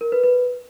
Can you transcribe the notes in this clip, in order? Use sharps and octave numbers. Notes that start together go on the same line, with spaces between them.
A#4
B4
B4